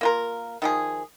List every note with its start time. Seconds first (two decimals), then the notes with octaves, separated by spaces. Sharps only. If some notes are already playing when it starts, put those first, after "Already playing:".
0.01 A#3 F4 A#4
0.62 D#3 F3 G#4